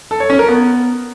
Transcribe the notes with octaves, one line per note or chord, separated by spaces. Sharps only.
A4
C#5
C#4
A#4
B3